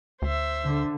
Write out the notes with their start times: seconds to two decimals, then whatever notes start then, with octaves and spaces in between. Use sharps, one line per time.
0.22 D2 C5 E5
0.66 D3